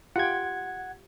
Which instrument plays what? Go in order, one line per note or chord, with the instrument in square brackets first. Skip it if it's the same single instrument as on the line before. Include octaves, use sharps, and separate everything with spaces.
[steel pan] F4 G4 G5 [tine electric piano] F#5 G#6